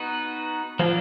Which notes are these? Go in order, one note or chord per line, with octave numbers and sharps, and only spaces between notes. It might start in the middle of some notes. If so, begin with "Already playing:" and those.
Already playing: B3 D#4 F#4 B4
F3 F#3 A#3 D4